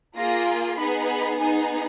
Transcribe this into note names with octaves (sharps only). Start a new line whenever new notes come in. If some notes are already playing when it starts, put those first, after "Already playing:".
A#3 F4 G#4 A#6
B3 D#4 G#4 B5
B5
B3 D#4 G#4 G#5